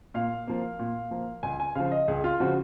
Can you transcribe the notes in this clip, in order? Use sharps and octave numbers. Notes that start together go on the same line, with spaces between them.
A#2 F5
F3 A#3
A#2
F3 A#3
C#2 G#5
G#5
C#3 F3 F5
D#5
C#2 G#4
F4
C#3 F3 F#4